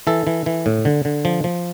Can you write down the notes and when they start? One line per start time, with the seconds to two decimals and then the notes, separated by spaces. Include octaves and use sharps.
0.07 E3 A4
0.27 E3
0.46 E3
0.66 A2
0.85 D3
1.05 D3
1.25 F3
1.44 F3